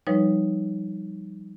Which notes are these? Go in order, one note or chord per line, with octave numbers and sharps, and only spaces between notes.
F3 G3 D#4 B4 C#5